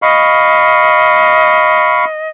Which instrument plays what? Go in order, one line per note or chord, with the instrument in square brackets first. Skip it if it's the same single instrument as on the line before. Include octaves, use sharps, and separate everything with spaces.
[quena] D#5 [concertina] F5 B5 C#6